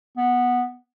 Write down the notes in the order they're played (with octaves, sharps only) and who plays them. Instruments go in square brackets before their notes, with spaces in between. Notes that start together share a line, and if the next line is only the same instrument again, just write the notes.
[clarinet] B3